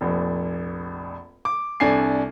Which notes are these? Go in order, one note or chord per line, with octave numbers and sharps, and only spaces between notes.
F1 A#1
D6
C2 D4 A4 G#5 C7